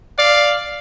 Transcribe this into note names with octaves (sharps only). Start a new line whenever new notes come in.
D5 F5